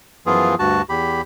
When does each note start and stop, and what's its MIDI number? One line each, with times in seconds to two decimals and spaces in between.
0.26 0.55 42
0.26 0.55 52
0.26 0.55 53
0.26 0.55 59
0.26 0.55 65
0.26 0.55 68
0.59 0.82 38
0.59 0.82 43
0.59 0.82 66
0.59 0.82 81
0.89 1.21 40
0.89 1.21 67
0.89 1.21 83